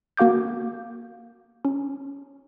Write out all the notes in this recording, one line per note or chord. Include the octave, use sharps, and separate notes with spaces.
A#3 F#4 F5 D6 G6
C#4